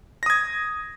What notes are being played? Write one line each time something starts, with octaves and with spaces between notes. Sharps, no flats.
D#6 G#6 A#6